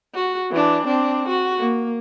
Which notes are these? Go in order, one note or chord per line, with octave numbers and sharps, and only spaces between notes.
F#4
E3 D4
C4 D4
F#4
A#3